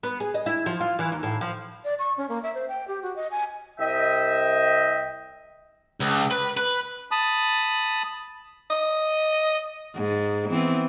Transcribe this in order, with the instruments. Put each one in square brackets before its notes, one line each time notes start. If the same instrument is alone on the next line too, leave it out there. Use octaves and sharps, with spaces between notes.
[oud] B3
G#4
D#5
E4
F3
F4
E3
D#2
A2
F3
[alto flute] D5
C#6
C#4
A#3
E5
C5
G5
G4
F#4
D#5
G#5
[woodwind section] C2 D#5 E5 G5
[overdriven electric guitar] C#2
B4
B4
[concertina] A5 B5 D#6
[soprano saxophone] D#5
[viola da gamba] G#2
E3 B3 C4